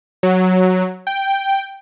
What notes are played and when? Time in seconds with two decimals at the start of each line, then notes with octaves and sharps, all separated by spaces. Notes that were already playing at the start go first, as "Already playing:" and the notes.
0.23 F#3
1.07 G5